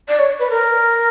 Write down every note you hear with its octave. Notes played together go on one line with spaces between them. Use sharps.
D5
C#5
B4
A#4